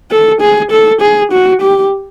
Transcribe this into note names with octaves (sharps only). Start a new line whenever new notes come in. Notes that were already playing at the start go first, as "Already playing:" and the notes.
A4
G#4
A4
G#4
F#4
G4